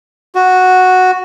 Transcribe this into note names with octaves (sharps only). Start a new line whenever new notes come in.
F#4